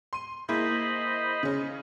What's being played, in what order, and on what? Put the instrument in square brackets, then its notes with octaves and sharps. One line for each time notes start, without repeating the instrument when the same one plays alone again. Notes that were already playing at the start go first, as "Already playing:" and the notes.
[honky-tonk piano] C6 D#7
[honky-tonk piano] A#3 E4 G#4 [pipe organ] C5 D#5 B5
[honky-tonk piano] C#3 C#4